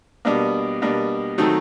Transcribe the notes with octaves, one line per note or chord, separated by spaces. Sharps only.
B2 G3 A#3 D4
B2 G3 A#3 D4
D#3 F#3 A3 C4 D#4